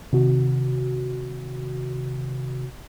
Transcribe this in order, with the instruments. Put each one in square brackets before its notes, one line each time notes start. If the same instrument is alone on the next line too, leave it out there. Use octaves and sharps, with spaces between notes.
[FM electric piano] C3 D#3 F#4